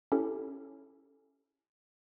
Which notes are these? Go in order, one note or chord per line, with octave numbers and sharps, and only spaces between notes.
C#4 E4 G4 A4